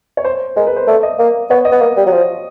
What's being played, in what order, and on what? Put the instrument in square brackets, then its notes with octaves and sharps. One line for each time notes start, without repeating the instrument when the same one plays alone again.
[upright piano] C#5
C5
[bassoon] G#3 [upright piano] A#4
[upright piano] B4
C5
[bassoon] A3 [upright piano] D5
[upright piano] D#5
[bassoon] A#3
[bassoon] B3 [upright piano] C#5
[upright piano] D#5
[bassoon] B3
A#3
G3
F#3
F3